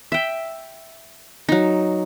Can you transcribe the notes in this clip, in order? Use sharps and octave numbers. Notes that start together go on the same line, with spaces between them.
E5 G5
F#3 D#4